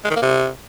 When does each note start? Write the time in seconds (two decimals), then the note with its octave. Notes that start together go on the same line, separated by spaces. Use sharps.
0.04 G#3
0.10 D#3
0.16 A#3
0.22 C3